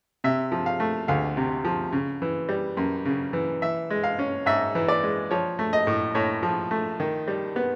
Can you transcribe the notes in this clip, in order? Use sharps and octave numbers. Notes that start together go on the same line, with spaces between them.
C3 E5
F3
F5
A3
D2 F5
C3
F3
C#3
E3
G3
F#2
C#3
E3
E3 E5
G#3
F5
C#4
G#2 E5
E3
D5
G#3
F3 C#5
A3
D#5
A2
A2 C#5
F3
A3
D#3
G3
B3